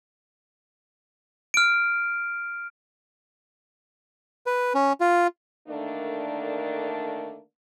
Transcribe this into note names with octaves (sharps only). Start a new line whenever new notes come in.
F6 D7
B4
C#4
F4
D3 D#3 A3 A#3 D4